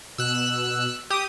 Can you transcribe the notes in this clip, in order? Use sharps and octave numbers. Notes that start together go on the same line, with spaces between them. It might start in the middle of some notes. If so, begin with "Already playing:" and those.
B2 E6 F#6
G4 D#6